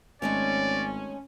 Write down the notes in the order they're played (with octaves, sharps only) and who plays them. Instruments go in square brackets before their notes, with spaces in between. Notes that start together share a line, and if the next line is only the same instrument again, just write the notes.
[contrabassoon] G#1 [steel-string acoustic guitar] G#3 A3 C#5 [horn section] C#4 [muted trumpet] D5